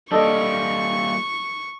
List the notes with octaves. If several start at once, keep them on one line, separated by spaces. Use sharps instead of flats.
G3 A#3 D4 A4 D#5 C#6